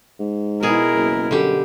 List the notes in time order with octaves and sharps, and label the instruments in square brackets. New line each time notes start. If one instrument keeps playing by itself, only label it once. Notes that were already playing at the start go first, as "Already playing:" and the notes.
[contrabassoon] G#2
[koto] B2 G#4 [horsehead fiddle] E4 A#4
[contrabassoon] F#1
[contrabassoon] F#2 [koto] D3 G3 G4